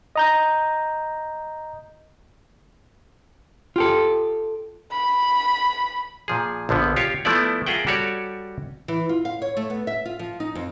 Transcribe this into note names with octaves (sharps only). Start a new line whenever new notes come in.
D#5 A#5 G6
F4 G4 A4
B5
A#2 F3 G#4
A#1 D3 F3 B3
F4 G4 C#5 F5
F3 A3 B3 E4 D5
F4 G#4 A#4 E5 F#5 G5
G3 F#4 G4 A4 C#5 D5
E3
F4
F5
C#5
A3
B3
E5
F4
F3
D#4
F2